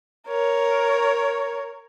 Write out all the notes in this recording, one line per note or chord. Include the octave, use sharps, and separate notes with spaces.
A#4 C#5